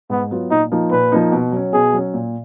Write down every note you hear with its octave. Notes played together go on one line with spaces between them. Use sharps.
G#2 B3
F#3 B3 F4
A#2 D#4
F3 A#3 D#4
A#2 B4
F3 A#3 D#4
B2
F#3 C#4
B2 G#4
F#3 C#4
A#2